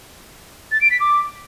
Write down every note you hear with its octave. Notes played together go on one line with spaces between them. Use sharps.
A6
D7
B6
D6